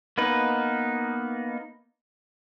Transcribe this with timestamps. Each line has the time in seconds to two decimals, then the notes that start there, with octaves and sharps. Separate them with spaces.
0.18 A#3 B3 D#4 B4